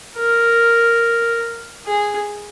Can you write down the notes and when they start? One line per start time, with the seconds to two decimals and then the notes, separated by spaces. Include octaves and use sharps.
0.17 A#4
1.87 G#4